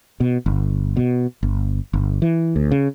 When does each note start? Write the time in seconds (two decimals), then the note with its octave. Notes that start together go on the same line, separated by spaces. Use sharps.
0.20 B2
0.46 G1
0.97 B2
1.43 G1
1.93 G1
2.22 E3
2.56 D2
2.72 C#3